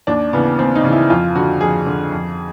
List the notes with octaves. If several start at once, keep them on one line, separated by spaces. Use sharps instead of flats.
D#2 D4
C#3 E3 B3
D#2 C4
D#4
C#3 E3
E4
F2 F4
D3 F#4
F2 G#4
D3
F2